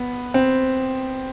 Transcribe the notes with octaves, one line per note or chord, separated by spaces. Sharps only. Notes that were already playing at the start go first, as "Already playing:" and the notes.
Already playing: B3
C4